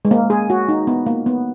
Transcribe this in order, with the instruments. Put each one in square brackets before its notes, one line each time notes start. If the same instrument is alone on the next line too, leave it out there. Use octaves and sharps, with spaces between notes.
[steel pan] G#3
A#3
G#4
F#4
D#4
B3
A#3
B3